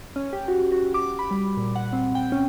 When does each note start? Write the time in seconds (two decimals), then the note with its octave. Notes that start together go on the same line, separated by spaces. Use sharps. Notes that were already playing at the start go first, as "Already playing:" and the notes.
0.16 C#4
0.33 G4
0.48 F#4
0.72 F#4
0.94 D6
1.19 B5
1.31 G3
1.57 A#2
1.76 F#5
1.93 C4
2.15 G5
2.32 C#4